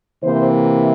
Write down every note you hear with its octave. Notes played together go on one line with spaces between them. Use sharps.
C3 E3 A#3 C5